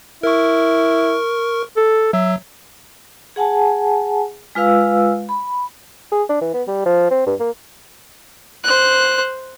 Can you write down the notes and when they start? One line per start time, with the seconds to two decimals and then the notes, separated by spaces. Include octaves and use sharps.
0.23 E4 A#4 C#6
1.77 A4
2.13 F#3 E5
3.36 G#4 F#5 G#5 A5
4.55 G#3 F4 B4 F5 E6
5.29 B5
6.12 G#4
6.29 D4
6.41 E3
6.54 B3
6.68 G3
6.86 F3
7.11 C4
7.27 G2
7.40 A#3
8.64 C5 F#6